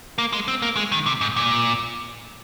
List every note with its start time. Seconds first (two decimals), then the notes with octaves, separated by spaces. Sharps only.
0.18 A#3
0.33 G#3
0.48 C4
0.62 A#3
0.77 G#3
0.92 D#3
1.06 C3
1.21 G#2
1.36 A#2